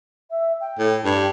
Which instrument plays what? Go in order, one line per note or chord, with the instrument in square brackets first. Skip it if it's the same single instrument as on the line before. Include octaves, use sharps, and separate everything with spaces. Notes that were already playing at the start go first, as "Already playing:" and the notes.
[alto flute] E5
G5
[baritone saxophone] A2
[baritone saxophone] G2 [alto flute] G4